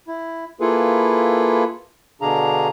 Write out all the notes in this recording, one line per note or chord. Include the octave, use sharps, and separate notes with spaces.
E4
A#3 E4 F4 G#4 A4 B4
B2 D3 D4 G#4 F5 A#5